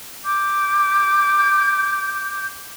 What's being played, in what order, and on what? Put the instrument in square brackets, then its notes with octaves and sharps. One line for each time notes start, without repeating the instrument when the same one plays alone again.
[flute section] D6 G6